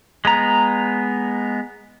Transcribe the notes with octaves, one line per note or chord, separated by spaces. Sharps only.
G#3 B3 A#5